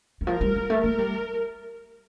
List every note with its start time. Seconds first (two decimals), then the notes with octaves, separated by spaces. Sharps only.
0.21 D#3
0.27 F3 A#4
0.41 G3
0.56 G3
0.70 A3
0.84 A#3 A#4
0.98 G3